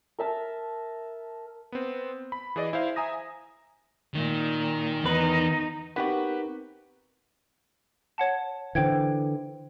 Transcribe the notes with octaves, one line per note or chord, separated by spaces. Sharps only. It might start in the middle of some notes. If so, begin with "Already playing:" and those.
A#4 E5 A5
B3 C4
B5
E3 G#4 D5 D#5
E4 C5 F5
E5 G#5 A#5 D#6 A#6
A#2 D#3
E2 D#4 B4
B3 C4 D#4 F#4 G4 A#4 B4 F#5
C#5 F#5 A5
D3 E3 C5 G5 G#6